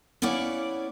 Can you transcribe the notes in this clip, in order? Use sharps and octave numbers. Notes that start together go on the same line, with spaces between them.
B3 C#4 E4 C#5 D5 F5